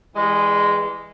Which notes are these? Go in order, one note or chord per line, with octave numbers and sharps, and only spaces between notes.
E3 G3 G#3